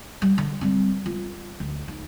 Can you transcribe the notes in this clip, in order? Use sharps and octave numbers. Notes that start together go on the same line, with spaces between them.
G3
D3
G3 C4
F4
D2
D#4